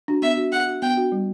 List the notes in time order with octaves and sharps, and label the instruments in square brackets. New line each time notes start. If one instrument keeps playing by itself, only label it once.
[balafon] D4 F#4
[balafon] B3 [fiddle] E5
[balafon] D4 F#4
[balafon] B3 [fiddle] F#5
[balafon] D4 F#4
[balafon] B3 [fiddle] G5
[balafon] D4 F#4
G3